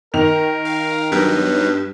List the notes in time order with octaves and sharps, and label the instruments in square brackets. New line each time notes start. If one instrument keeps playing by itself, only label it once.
[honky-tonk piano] D#3 F7 [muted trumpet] A#4
[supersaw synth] F5
[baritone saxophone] G2 [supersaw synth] F#3 B3 D#4